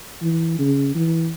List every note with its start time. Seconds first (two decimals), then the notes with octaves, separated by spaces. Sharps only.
0.22 E3
0.59 C#3
0.95 E3